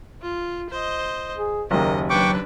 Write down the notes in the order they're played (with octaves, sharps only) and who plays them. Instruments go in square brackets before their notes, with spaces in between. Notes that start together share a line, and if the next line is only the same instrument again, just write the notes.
[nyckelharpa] F4
C5 D#5
[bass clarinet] G#4
[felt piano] F#1 D#2 [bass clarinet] A#4 [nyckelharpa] D#5
[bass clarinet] F#3 [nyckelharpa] D4 B4 [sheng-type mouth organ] G5 C#6 D6